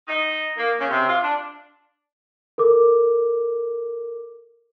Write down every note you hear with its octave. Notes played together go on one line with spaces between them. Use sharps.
D#4
A#3
C#3
C3
F4
D4
A4 A#4 D6